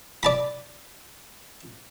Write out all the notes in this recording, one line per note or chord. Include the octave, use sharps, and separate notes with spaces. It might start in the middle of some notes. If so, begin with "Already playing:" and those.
D5 A5 B5